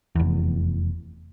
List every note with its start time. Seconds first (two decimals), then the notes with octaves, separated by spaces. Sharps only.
0.15 F1 E2